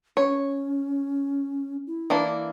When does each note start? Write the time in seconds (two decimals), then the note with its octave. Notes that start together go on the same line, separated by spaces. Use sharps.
0.17 C#4 C#5
1.87 E4
2.10 E3 A#3 D4